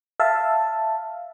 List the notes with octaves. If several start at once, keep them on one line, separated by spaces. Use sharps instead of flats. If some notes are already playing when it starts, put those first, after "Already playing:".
E5 F5 A5